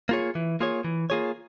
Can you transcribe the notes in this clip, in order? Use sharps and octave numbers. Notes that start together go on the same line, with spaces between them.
A#3 F4 G#4 C#5
E3
A#3 F4 G#4 C#5
E3
A#3 F4 G#4 C#5